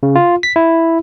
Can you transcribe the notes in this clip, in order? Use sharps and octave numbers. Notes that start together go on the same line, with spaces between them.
C#3
F4
B6
E4